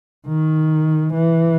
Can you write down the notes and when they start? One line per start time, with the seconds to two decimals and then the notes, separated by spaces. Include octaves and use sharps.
0.28 D#3
1.14 E3